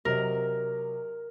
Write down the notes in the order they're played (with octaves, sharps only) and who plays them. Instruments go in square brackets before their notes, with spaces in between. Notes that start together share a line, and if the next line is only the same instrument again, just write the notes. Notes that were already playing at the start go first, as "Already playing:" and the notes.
[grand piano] C3 F#3 D#5 [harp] A#4